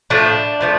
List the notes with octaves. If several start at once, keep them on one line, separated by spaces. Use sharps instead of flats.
A2 F3 A3 D4
A2 F3 A3